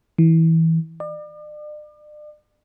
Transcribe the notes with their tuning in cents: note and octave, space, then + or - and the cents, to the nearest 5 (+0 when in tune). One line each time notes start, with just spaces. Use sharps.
E3 -20
D5 +40